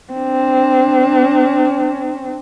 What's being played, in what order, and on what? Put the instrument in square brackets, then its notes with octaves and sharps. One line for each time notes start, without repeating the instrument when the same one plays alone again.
[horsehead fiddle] C4 D4